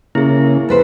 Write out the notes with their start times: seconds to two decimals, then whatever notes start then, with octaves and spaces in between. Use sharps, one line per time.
0.15 C#3 A#3 E4 G#4
0.69 F2 B4 C5